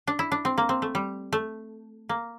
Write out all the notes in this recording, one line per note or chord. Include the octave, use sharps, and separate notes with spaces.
D4
E4
D4
C4
A#3
C4
A3
G3
A3
A#3